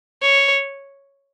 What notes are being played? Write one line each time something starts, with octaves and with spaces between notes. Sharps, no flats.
C#5